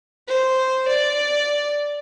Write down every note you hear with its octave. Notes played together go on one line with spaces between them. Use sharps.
C5
D5